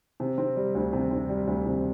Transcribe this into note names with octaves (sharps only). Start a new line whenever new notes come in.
C3
C4
G3
D2
C3
C4
G3
D2
C3